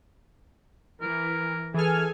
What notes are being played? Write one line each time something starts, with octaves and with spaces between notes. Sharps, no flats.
E3 A#4
E3 G#4 A4 G#5 F6